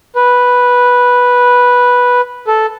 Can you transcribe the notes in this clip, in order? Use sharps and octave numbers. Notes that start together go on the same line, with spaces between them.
B4
A4